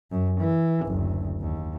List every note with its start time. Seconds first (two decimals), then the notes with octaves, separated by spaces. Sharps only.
0.11 F#2
0.40 E3
0.86 F#1 D2
1.41 D#2